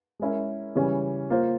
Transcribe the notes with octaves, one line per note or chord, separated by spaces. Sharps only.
G#3 C#4 E4 A#4
C#3 E3 G3 C#4
A#3 F4 C5